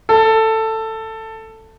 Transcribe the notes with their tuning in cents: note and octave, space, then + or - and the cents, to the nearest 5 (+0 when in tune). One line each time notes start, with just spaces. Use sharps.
A4 +10